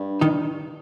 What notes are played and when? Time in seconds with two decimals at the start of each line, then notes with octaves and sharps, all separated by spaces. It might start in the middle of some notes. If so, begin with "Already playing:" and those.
Already playing: G2
0.21 D#3 D#4